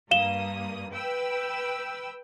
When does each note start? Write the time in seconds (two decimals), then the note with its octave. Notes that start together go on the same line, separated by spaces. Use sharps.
0.11 G2 A#3 F5 D#6 E7 G7
0.93 B4 G5 E6